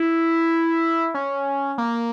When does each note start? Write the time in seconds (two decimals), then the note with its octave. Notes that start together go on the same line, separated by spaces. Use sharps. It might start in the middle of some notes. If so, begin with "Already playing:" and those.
Already playing: E4
1.14 C#4
1.78 A#3